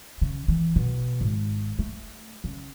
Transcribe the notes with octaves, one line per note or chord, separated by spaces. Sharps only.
C#3
E3
B2
G#1
A3
C#3